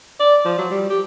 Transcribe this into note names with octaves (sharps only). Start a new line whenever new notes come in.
D5
F3
F#3
G3
G4